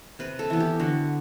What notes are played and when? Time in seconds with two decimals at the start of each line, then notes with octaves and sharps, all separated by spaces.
0.19 C3 B4
0.39 A4
0.50 E3 B3
0.60 G4
0.79 D3 F#4